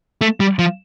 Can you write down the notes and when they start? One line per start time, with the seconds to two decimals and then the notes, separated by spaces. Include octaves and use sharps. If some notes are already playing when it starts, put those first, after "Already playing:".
0.21 A3
0.40 G3
0.59 F3